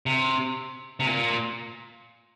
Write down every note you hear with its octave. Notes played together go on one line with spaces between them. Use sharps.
C3
C3
A#2